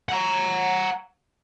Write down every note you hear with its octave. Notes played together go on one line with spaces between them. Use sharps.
F#5 A#5